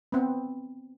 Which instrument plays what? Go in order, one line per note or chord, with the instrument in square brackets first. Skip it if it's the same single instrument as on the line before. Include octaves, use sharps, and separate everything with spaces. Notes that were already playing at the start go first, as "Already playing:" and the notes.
[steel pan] B3 C4